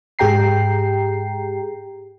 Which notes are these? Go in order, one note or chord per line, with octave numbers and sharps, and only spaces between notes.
G#2 G4 G#4 G5 A#5 C7